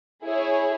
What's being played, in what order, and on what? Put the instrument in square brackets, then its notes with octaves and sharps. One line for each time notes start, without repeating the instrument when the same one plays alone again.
[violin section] E4 G#4 C#5